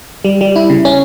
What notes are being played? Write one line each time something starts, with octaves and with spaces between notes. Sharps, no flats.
G3
G3
E4
C#3
C#4